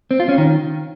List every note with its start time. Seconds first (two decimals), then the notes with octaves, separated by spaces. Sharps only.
0.11 C4
0.20 F4
0.29 C#4
0.38 D#3